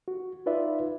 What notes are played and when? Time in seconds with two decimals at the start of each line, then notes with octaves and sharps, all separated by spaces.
0.08 F#4
0.46 D#4 F4 B4 D5 E5